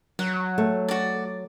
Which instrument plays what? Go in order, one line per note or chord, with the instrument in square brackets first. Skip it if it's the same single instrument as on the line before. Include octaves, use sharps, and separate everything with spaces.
[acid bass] F#3 [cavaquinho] F#5
[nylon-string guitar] A3
[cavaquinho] F#4 D5